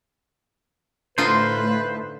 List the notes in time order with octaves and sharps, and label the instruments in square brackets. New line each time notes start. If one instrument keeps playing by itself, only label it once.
[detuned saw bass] A2 [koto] D3 D#4 F4 [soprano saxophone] B4 [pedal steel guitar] C5